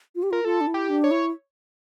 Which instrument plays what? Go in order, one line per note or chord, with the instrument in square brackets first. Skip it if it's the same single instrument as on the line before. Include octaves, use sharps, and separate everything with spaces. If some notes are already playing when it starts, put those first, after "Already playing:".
[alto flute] F4
G4
[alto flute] F4 [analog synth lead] A#4
[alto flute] F4 [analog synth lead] A4
[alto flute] D4
E4
[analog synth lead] G4
[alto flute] D4
[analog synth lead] C#5
[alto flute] E4